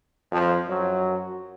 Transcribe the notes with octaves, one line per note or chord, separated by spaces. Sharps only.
F2 F3
F#2 F#3